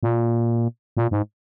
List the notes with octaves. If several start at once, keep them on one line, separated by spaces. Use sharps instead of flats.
A#2
A#2
G#2